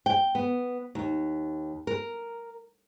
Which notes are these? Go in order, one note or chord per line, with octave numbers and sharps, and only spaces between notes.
G5
B3
D#2
A#4